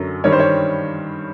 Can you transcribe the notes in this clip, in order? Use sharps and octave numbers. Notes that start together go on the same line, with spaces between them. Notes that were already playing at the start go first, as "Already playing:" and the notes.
Already playing: F#2 D3 F#3
G2 D#3 G3 C#5
C5
C#5